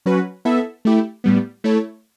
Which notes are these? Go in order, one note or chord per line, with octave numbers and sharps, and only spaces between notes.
F#3 C#4 F#4 B4
B3 E4 A4 E5
A3 E4 G4
A2 G3 B3
A3 E4 A4 C#5